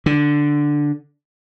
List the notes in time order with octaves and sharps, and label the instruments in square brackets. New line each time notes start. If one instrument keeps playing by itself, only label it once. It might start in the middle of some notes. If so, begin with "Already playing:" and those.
[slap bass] D3